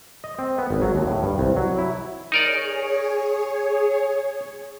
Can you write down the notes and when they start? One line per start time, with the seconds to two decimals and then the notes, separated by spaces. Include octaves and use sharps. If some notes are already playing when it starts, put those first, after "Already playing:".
0.24 D#5
0.39 C4
0.58 B3
0.71 G#1
0.82 F#3
0.95 D#2
1.07 A2
1.23 G2
1.38 C2
1.57 F#3
1.78 E4
2.32 D#4 G#4 A#4 C#5 D5